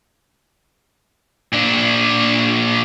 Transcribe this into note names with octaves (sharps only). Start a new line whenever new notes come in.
A#2 D4